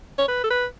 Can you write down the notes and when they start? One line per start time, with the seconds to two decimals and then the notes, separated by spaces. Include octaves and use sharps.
0.18 C#5
0.29 B4
0.44 A4
0.50 B4